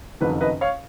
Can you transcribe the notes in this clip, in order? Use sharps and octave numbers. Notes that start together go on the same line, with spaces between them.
F#1 F2 D#3 F#3 B4
B4 D#5
C#5 F5